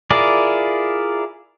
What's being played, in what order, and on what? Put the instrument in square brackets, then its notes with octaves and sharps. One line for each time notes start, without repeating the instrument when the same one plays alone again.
[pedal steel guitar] E4 F4 G#4 A#4 D5